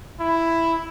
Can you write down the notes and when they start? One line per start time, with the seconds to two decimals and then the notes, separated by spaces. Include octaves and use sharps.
0.20 E4